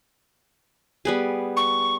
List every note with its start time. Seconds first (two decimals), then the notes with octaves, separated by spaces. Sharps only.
1.05 G3 B3 G#4
1.56 C#6